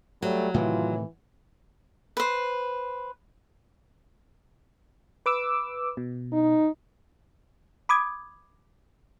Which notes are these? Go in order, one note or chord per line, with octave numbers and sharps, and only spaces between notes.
F#3 G3 A3
A2 C3 D#3 E3 F4
B4 C5
B4 D6 E6
B2
D#4
B5 D6 D#6 G#6